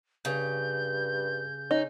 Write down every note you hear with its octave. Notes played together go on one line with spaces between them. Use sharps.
G2 C#3 G6
C#4 D#4